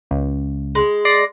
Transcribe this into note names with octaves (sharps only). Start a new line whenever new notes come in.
C#2
G#3
D5 A#6 C7